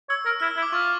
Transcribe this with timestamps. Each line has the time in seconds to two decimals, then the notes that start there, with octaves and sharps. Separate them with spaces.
0.09 C#5 E6
0.25 A#4
0.40 E4 F6
0.51 E6
0.56 E4
0.62 D6
0.72 F4 C#6